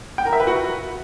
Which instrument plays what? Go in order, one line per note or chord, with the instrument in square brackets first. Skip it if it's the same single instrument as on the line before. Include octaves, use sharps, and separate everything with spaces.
[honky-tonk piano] G5
A#4
E5
B4
F#4